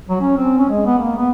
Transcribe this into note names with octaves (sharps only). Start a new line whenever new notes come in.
F#3
C#4
C4
C#4
G#3
B3
A#3
B3